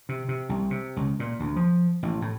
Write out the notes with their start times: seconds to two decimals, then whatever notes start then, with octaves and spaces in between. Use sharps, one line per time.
0.09 C3
0.29 C3
0.49 C2
0.71 C3
0.96 C#2
1.20 A#2
1.40 D2
1.56 F3
2.03 A1
2.22 A2